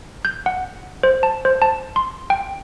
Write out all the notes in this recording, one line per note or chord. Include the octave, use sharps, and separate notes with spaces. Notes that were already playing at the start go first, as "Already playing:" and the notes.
G6
F#5
C5
A5
C5
A5
C6
G5